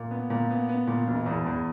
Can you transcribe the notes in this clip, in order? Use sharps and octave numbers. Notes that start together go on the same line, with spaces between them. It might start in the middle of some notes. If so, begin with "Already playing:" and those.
Already playing: A#2
B3
A#2
B3
B3
A#2
E1
E2
E2